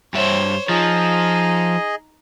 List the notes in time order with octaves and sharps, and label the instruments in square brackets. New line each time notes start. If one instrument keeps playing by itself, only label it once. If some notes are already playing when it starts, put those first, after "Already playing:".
[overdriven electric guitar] G2 E5 [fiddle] C5 C#5
[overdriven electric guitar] F3 [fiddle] D#4 [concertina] G#4 D#5